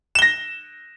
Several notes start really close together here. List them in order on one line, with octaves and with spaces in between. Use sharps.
E7 G7 A#6